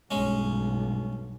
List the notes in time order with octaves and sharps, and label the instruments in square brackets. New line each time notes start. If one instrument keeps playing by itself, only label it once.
[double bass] B1 G2 [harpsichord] G#3 C#4